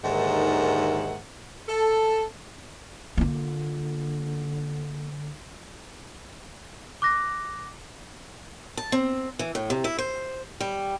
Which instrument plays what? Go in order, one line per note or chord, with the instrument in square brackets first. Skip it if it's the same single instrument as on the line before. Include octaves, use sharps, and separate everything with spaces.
[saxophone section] D#2 G#2 D3 D#3 E5 F#5
A4
[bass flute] D3 [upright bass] A#3 F4
[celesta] D6 F#6 A#6
[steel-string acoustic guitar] A5
C4
E3
A2
C3
E4
C5
G3